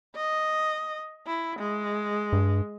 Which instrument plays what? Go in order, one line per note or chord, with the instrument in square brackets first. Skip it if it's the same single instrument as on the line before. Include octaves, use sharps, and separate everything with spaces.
[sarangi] D#5
E4
G#3
[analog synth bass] G2